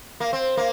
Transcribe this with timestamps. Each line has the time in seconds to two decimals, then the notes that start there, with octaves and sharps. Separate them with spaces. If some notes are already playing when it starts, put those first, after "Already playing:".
0.20 A#3
0.33 C4
0.57 A#3